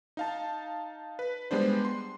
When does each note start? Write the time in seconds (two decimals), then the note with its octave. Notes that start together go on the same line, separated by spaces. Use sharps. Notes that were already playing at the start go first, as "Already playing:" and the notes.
0.17 D#4 F5 A5
1.19 B4
1.51 G3 G#3 B3 D4 C5
1.85 C6